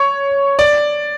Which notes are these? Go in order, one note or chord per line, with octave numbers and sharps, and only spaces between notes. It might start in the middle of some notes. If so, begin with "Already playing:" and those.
Already playing: C#5
D5